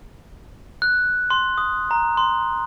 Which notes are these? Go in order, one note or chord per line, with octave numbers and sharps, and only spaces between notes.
F#6
C6
D#6
A#5
C6